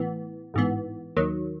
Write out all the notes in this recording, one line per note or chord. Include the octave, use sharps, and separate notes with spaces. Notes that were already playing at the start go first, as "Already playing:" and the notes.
Already playing: A2 E3 B3
A1 G#2 E3 B3
D#2 D#3 F#3